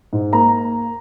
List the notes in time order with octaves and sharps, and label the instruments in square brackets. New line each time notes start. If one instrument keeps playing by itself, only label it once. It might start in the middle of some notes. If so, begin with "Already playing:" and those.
[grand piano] G#2
A#3 A#5